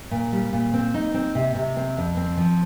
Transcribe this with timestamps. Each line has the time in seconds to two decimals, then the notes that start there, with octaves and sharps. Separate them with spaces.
0.11 A#2
0.32 G3
0.53 A#2
0.74 C4
0.94 D#4
1.14 C4
1.35 C3
1.55 C3
1.77 C4
1.97 F2
2.17 C4
2.37 F3